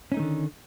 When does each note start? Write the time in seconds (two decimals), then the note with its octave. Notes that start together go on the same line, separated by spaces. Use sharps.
0.12 C#4
0.14 D#4
0.17 A3
0.19 D#3
0.22 D3